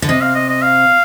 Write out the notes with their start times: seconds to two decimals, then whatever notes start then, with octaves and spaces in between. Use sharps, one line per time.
0.02 D3
0.09 C3 D#5
0.21 F5
0.35 D#5
0.49 D#5
0.62 F5